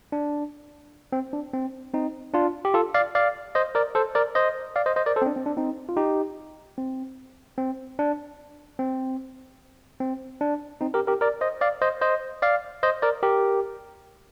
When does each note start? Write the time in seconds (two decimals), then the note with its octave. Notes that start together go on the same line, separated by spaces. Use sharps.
0.12 D4
1.12 C4
1.33 D4
1.53 C4
1.94 C4 D#4
2.33 D4 F4
2.65 G4
2.74 F4 A4
2.94 D5 F5
3.15 D5 F5
3.55 C5 D#5
3.75 A#4 D5
3.95 A4 C5
4.15 A#4 D5
4.35 C5 D#5
4.76 D5 F5
4.86 C5 D#5
4.96 C5 D#5
5.06 A#4 D5
5.16 A4 C5
5.22 C4
5.26 D4
5.36 C4
5.46 D4
5.57 C4 D#4
5.89 F4
5.97 D#4 G4
6.78 C4
7.58 C4
7.99 D4
8.79 C4
10.00 C4
10.41 D4
10.81 C4 D#4
10.94 G4 A#4
11.07 G4 A#4
11.21 A#4 D5
11.41 C5 D#5
11.61 D5 F5
11.82 C5 D#5
12.01 C5 D#5
12.42 D5 F5
12.83 C5 D#5
13.02 A#4 D5
13.23 G4 A#4